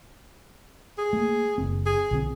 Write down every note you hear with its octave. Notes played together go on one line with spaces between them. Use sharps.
G#4
A3 A#3
F#1 C4
G#4
B1 D3 C4